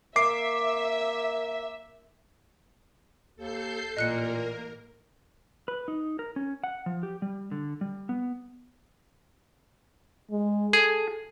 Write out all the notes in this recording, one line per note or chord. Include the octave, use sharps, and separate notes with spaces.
A#3 E5 D6 C7
D#2 A4 G6 C7
A1 A#2 A#3 A#4 D#5 F#6 C#7
B4
D#4
A#4
C#4
F#5
F3
G4
G3
D3
G3
B3
G#3
G#4 A4